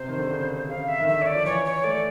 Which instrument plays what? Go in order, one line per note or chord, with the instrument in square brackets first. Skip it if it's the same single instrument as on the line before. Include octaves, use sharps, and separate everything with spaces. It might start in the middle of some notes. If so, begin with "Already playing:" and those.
Already playing: [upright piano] C3 [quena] C5
[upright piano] D#3
D3
C#3
[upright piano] C#3 [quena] F5
[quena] E5
[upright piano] D#3
[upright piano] D3 [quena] E5
[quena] C#5
D5
[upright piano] F3
[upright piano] E3 [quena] C#5
[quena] C#5
[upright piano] A3 [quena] D5